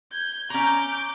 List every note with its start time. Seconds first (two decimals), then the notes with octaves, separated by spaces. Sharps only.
0.12 G6 G#6
0.50 C#4 A#5 D6 G6